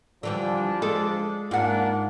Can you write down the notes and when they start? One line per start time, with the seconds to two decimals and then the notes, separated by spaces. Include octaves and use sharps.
0.23 D3 E3 F3 G3 D4
0.82 G#3 A4
1.51 G#2 A#3 D4 F4 F#5